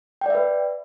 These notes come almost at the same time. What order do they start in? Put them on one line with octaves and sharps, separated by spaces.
G5 D5 E5 B4